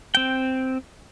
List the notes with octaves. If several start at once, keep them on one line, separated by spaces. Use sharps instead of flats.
C4 G5